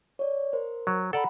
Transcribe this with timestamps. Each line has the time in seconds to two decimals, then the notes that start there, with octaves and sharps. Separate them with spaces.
0.19 C#5 D5
0.53 A#4 C5
0.87 F#3
1.13 A4 D5 F#5 A#5 B5